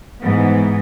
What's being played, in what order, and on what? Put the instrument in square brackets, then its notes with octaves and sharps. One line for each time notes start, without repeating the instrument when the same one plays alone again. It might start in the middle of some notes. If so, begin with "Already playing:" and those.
[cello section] G#2 E3 B3